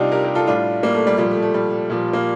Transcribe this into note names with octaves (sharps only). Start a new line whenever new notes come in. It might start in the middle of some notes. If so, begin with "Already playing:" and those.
Already playing: C3 G3 D4 D#4 F4 G4
G4 A#4
G4 A#4
F4 A4
A2 G3 D4 F4
G3 A#3
A3
G3
A#2 F3 G3
A3
A3
G3
A#2 F3
A#3